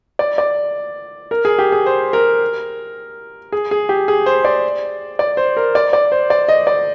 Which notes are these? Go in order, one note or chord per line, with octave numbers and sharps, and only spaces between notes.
D5
D5
A#4
G#4
G4
G#4
C5
A#4
G#4
G#4
G4
G#4
C5
D5
D5
C5
A#4
D5
D5
C5
D5
D#5
D5